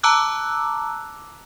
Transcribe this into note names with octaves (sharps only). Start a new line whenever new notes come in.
A5 A#5 D6 E6 F#6